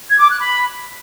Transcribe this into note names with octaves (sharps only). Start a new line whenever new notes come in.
G#6
D6
F#6
B5